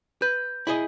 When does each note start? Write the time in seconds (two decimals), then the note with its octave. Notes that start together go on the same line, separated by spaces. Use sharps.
0.22 B4 G6
0.67 E4 G#4 D#5